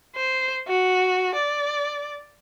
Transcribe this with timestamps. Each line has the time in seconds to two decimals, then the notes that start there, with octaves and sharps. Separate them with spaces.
0.15 C5
0.67 F#4
1.34 D5